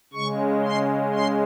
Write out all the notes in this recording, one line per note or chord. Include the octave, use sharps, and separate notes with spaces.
C#3 G#3 C#6
C6
C6